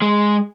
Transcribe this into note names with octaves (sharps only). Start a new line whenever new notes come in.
G#3